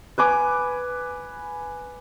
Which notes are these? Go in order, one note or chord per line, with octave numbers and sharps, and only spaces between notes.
B4 G#5 D6